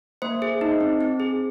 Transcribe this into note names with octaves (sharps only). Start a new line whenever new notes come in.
A#3 C5
G#4
D#4
C4
C4
G#4